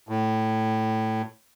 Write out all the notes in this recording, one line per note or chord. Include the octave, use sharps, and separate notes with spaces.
A2